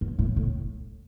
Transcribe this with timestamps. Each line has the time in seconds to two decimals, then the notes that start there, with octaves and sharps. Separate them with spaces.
0.01 F#2
0.19 A2
0.36 A2